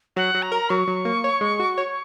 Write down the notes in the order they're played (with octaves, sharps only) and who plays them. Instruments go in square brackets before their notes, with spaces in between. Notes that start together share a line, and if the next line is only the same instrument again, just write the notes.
[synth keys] F#3 [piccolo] F#5
[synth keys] F#3
[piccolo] A#5
[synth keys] A#4
[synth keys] F#3 [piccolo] C#6
[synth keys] F#3
A#3
C#5
G#3
F#4
C#5